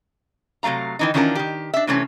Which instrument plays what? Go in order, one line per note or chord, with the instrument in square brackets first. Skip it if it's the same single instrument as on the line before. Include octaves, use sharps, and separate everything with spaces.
[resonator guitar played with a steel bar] C3 F#3 A3 F5 A#5
D#3 E3 D#4
D#3 E3 C#4 D4 F4 A#4
D#3 G4
D4 E5
C3 E3 A3 C4 C#4